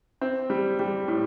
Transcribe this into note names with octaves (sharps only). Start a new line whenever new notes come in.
C4
G3
G3
A2